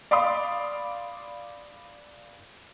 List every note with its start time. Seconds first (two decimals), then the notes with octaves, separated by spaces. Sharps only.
0.11 D5 F5 B5 C6 D#6